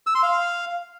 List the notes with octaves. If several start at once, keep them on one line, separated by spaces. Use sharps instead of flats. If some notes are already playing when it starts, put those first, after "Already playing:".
E6
C6
F5